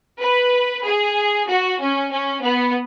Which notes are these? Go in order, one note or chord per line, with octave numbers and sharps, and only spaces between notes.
B4
G#4
F#4
C#4
C#4
B3